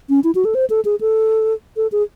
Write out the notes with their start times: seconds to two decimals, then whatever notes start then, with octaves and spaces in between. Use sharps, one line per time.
0.09 C#4
0.24 E4
0.35 F#4
0.45 A4
0.55 C5
0.70 A4
0.85 G#4
1.01 A4
1.77 A4
1.92 G#4